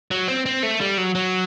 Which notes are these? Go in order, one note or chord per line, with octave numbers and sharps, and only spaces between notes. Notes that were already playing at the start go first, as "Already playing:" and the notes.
F#3
C4
C4
A3
G3
F#3
F#3